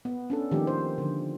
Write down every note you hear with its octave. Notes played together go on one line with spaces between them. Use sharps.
B3
C#4 D4 A4
D#3 F3 G#3 A#3 G4
C5
D3 F3